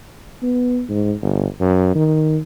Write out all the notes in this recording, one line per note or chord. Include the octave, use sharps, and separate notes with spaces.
B3
G#2
G1
F#2
D#3